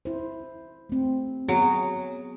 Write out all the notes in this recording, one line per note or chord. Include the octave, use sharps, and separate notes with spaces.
E4 C5
A3 C4
F#3 B3 F#4 G#4